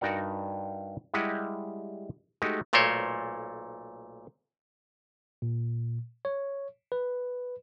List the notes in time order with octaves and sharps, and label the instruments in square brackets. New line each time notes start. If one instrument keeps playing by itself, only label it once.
[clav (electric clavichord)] G2 D#4 F#4 A#4 D5 F#5
G3 G#3 E4 G4 D#5 F#5
G#3 A3 D#4 F#4 G4
B1 A#2 A3 A#4 C5 C#5
[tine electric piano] A#2
C#5
B4